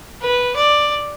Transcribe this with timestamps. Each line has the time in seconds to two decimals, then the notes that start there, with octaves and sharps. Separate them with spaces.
0.22 B4
0.56 D5